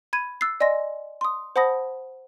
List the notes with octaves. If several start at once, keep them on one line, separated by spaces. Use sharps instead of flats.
B5 G#6 D#7
E6 F#6 A6 C7
D5 D#5 G#5 C6 A#6
C6 D#6
C5 F#5 A5 B5 D#6 A#6